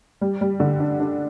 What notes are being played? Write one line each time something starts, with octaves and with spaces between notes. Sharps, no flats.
G3
G3
D3
D4
D4